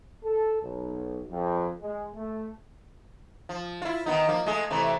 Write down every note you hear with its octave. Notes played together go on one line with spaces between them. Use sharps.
A4
B1
F2
G#3
A3
F3
E4 F4
D#3 B3 D#4
F3 A#3
G#3 A3 G#4
C3 E3 A3